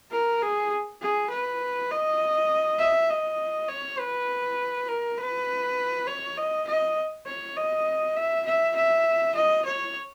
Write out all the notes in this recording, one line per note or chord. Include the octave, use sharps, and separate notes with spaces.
A#4
G#4
G#4
B4
D#5
E5
D#5
C#5
B4
A#4
B4
C#5
D#5
D#5
C#5
D#5
E5
E5
E5
D#5
C#5